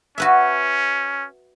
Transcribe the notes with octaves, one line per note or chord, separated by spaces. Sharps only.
C#4 F#4 B4 E5